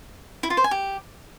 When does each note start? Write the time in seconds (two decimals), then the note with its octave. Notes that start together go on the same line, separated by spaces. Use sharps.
0.43 E4
0.50 F4
0.57 C5
0.64 G#5
0.71 G4